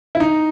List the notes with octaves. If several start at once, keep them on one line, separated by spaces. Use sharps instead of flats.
E4
D#4